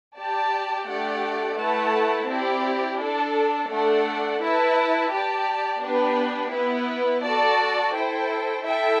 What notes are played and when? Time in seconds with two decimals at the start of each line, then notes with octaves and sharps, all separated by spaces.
0.17 G4 D5 A5
0.88 A3 D4 G4 D5 F#5
1.58 A3 E4 B4 F#5 A5
2.29 C4 E4 G4 D5
3.00 D4 A4 D5 A5
3.70 A3 D4 A4 D5 F#5
4.42 E4 B4 E5 A5
5.12 G4 D5 A5
5.83 B3 D4 G4 B4
6.53 B3 E4 B4
7.24 F#4 A4 D5 A5
7.95 E4 A4 C5 G5
8.65 E4 A4 E5 G5